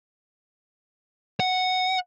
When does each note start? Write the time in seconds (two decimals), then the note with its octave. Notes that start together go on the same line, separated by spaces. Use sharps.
1.40 F#5